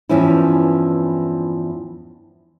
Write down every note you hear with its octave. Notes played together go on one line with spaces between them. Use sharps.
E2 G2 E3 F3 C#4 E4